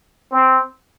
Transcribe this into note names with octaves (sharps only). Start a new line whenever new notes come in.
C4